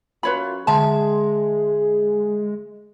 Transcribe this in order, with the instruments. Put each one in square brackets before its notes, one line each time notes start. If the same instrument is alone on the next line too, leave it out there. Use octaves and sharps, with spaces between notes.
[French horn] F#2 [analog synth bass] F4 [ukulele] B4 C#5 B5
[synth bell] D3 E5 C6 [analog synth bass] G#3 [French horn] G#4 [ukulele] A5